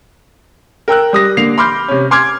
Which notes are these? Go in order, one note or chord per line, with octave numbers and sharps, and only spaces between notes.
A#4 G5 E6 F#6
G3 D#6 A#6
D3 A#3 C7 F7
B5 C6 D6 F6 G6
C3 C#4
G#5 C6 D6 F6 G#6